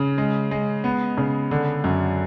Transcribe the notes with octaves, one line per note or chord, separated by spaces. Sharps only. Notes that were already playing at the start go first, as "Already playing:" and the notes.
Already playing: C#3
G#3
G#3
B3
C#3
D3
F#2